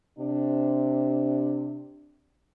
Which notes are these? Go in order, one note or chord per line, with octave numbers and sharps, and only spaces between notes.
C3 D4